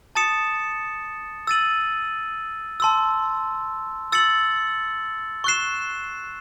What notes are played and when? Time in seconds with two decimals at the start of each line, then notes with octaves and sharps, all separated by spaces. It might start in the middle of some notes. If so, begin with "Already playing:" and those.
0.15 A5 D#6 A6 C#7 E7
1.47 E6 A6 D#7 F#7
2.80 A5 C6 E6
4.12 E6 A6 C#7 F#7
5.44 C#6 F#6 C7 E7